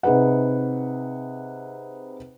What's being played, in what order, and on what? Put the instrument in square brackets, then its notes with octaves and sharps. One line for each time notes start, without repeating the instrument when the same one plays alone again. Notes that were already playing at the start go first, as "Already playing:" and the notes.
[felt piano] C3 D#4 G#4 B4 F#5